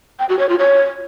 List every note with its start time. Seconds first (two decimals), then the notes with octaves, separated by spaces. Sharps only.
0.19 G5
0.29 F#4
0.39 C#5
0.49 F4
0.59 C#5